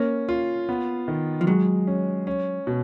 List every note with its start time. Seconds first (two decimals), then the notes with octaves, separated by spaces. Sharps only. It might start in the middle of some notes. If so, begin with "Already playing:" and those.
Already playing: A#3 C#4
0.29 F4
0.69 B3
1.08 D#3
1.41 F3
1.47 F#3 G#3
1.87 C#4
2.27 C#4
2.67 B2